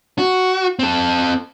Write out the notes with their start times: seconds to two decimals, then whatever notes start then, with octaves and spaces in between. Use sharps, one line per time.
0.18 F#4
0.79 C4 A4